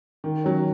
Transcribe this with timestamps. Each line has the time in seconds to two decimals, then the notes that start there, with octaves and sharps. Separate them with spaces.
0.24 D#3
0.44 F#3 C#4